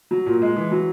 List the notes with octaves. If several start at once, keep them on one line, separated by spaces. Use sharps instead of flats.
F#3
A#2
G#3
E3
F#3